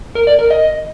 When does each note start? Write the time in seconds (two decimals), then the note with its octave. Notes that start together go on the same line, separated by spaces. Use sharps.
0.15 A#4
0.27 D5
0.39 A#4
0.50 D#5